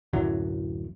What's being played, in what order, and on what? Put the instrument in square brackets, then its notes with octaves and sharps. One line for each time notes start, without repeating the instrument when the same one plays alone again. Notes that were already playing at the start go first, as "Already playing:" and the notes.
[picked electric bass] D1 F#2 E3 F#3